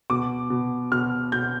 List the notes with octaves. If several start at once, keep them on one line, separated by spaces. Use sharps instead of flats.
B2 D6
B2
B2 F6
B2 G6